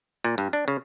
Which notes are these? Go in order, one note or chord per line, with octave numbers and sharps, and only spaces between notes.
A#2
G2
D4
C#3